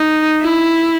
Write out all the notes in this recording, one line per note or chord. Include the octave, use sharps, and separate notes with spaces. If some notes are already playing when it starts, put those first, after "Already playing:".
Already playing: D#4
E4